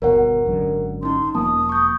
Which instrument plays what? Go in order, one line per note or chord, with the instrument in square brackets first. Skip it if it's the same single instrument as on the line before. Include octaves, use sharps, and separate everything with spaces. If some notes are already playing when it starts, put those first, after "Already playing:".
[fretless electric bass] G1 D#2 B2 [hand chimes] A#4 C#5 F#5
[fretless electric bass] G#1 F#2 D3
[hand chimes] C#4 D#4 [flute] C6
[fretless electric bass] E1 F3 A#3 [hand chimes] A5 [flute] D#6
[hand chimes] C#6 G6